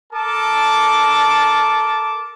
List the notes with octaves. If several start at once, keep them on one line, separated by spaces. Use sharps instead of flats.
A4 A#4 A5 D6